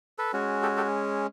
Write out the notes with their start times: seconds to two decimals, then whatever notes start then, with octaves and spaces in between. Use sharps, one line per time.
0.18 A4 B4
0.33 G#3 C#4 F#4
0.62 G4 A4
0.77 G4 A4